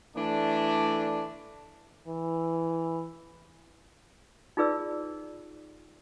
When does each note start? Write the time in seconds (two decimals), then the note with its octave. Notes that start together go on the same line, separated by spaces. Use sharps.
0.16 E3 A3 D4
2.07 E3
4.57 D#4 F4 G#4 B4 D5 E6